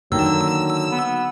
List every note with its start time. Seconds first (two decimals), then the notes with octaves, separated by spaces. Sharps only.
0.12 D3 D#3 F#3 A#3 E6
0.91 B3